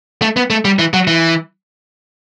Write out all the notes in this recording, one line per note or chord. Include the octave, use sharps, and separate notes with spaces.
A3
B3
A3
G3
E3
F#3
E3